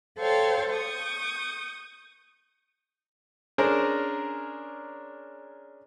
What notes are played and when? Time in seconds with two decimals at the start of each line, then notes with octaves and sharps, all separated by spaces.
0.18 A4 C5 C#5 F5 G5
0.73 C#6 D#6 G6
3.58 C#4 D4 G#4 A#4 C5